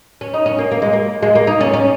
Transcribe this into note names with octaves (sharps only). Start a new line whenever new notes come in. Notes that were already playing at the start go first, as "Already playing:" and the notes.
C#4
D#4
C#4
A#3
A#3
G#3
A#3
G#3
A#3
D#4
C#4
C#4